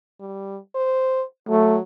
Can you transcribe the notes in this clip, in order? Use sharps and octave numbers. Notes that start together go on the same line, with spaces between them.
G3
C5
F#3 A3